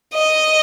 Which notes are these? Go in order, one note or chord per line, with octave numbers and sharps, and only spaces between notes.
D#5